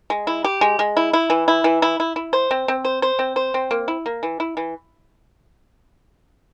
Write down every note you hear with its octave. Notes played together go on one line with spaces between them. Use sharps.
G#3
E4
G4
G#3
G#3
E4
E4
E3
E4
E3
E4
E4
E4
C5
C4
C4
C5
C5
C4
C5
C4
A#3
E4
A#3
E3
E4
E3